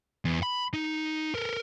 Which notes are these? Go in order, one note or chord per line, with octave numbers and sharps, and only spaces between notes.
E2
B5
D#4
A4 A#4